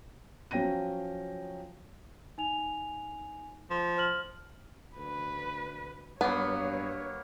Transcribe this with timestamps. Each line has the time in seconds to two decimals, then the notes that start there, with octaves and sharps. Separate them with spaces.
0.51 F3 F#3 C#4 G5 A#6 D#7
2.38 D#4 G#5 F7
3.70 F3
3.97 C5 F6 F#7
4.97 D2 B4
6.21 G2 F#3 A#3 B3 B4 C#5